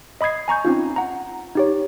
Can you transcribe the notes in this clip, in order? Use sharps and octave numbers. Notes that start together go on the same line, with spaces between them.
D#5 B5 D#6 G#6 C7
G#5 A#5 C#6 G6
C4 C#4 D#4 F4
F#5 A#5
D#4 G4 C#5